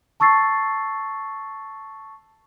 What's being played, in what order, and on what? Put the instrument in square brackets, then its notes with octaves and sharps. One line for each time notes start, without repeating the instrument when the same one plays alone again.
[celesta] A5 C#6 E6 A6 C7